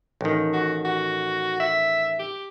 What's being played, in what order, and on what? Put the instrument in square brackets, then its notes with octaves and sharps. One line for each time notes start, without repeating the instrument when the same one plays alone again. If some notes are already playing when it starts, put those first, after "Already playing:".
[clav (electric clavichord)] A1 D#3
[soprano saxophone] F#4
F#4
E5
G4